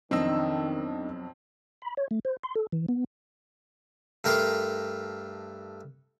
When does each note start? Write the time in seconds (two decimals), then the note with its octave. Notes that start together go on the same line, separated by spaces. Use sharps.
0.11 B1 F2 D#3 C4 D4 D#4 D#5 E6
1.82 B5
1.97 C#5
2.11 A3
2.25 C5
2.43 C6
2.55 A4
2.72 E3
2.89 B3
4.24 G2 A3 A#4 G5 C6 D6